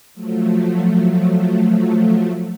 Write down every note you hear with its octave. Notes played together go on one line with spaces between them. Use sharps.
F3 F#3 A3